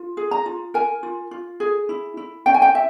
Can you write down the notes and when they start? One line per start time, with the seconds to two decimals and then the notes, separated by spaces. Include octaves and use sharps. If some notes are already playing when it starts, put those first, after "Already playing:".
Already playing: F4
0.17 G#4
0.31 A#5
0.46 F4
0.74 A#4 G#5
1.03 F4
1.31 F4
1.60 G#4
1.89 E4
2.17 E4
2.46 C#4 G5
2.54 G#5
2.62 G5
2.75 E5